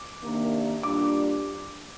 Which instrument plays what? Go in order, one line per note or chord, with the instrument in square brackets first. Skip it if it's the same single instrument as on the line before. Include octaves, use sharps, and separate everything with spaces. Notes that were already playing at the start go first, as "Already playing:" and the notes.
Already playing: [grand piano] D6
[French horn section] C3 D#3 A#3 D4
[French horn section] A#2 G3 D4 [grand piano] D6